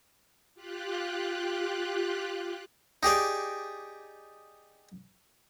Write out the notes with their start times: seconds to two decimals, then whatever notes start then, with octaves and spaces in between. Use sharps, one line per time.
0.55 F4 G4 F#6
3.03 D#4 G4 G#4 D5